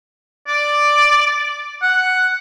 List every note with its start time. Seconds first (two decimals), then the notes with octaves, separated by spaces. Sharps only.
0.48 D5
1.82 F#5